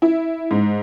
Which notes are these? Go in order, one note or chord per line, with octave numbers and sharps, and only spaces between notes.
E4
G#2